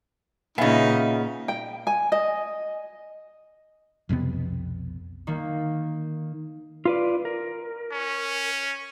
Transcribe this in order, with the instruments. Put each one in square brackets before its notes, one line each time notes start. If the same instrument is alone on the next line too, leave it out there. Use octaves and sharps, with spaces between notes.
[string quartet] A#2 [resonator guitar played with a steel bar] C#3 B3 [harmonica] D#4 [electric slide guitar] E5 F5 G#5
[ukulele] G5
G#5
D#5
[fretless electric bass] B1 F2 C3 B3
[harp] D#3 A#3
[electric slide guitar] F4 B4 D5
A#4
[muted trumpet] C#4